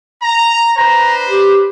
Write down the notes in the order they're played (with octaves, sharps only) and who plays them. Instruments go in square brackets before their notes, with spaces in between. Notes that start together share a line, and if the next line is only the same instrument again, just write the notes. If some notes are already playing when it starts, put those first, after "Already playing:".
[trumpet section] A#5
[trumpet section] D4 B4 C5 [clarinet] A#5
[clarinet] G4